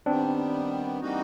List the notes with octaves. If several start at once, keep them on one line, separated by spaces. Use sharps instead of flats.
D#3 G3 B3 C4 D4
E3 G3 A#3 D#4 F#4